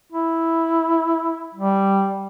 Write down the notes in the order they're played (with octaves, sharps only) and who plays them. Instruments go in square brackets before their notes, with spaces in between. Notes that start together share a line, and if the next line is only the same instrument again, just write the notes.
[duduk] E4
G3